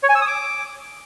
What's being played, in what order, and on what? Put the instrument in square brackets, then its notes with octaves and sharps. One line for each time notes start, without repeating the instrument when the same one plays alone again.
[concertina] C#5
G#5
E6
D#6
D6